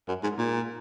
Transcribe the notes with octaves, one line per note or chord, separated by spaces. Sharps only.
F#2
G#2
A#2